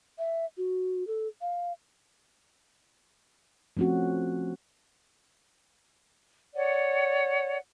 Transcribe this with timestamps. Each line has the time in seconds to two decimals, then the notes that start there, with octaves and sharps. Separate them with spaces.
0.19 E5
0.57 F#4
1.07 A4
1.41 F5
3.77 F3 A3 C4 C#4 F#4
6.54 C#5 D5 F#5